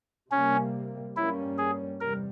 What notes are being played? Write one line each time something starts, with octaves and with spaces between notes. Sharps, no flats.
C3 G3 A#3 C#4
G2 G3 A#3 C#4 E4
G#4
E2 C3 G3 A#4